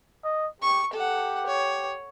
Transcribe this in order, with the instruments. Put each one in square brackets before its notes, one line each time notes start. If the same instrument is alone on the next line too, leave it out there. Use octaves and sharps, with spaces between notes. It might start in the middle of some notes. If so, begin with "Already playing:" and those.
[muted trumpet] D#5
[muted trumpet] G4 [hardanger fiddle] C#6
[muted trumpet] G4 [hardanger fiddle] A4 F#5
[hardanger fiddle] C#5